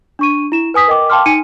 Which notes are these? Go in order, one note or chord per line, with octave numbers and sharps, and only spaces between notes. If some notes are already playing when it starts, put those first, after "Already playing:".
D4 C#6 D#7
E4 E7
B4 G#5 D#6 B6
A#4 D#5 G5 D6
F5 G5 A5 C6 D6 F6
D#4 G#5 C#7 D#7